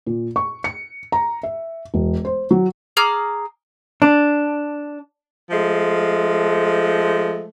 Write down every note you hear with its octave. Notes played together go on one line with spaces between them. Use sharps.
A#2
C#6
C#7
A#5
E5
E1
C5
F#3
G#4 A#5 D6 F6
D4
F3 G#3 A3